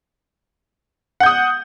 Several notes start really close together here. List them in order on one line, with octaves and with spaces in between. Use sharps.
F#5 G6 D#6